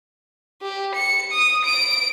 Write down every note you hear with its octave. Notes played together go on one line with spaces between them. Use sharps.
G4
C#7
D#6
D7